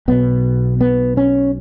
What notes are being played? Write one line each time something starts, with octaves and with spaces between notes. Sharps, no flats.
B1 B2 B3
B3
C#4